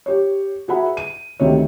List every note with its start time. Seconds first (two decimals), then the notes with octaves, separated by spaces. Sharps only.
0.06 G4 C#5
0.68 F#4 G#4 B4 E5 F#5 B5
0.97 D#7
1.40 D2 C3 D#3 C#5